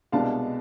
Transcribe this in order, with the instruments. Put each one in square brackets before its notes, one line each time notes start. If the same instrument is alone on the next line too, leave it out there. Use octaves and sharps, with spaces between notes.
[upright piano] C2 B2 G#3 D4 F5 A5